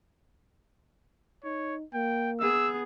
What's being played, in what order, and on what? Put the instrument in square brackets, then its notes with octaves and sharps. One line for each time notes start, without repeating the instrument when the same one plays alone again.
[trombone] D#4 [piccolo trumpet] C#5
[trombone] A#3 [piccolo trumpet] G5
[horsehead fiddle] B3 G#4 [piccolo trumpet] E6